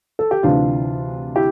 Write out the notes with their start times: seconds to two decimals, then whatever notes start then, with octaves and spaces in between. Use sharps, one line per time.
0.19 A4
0.31 G4
0.43 D2 C3 E3 D4 F4
1.35 E4 G4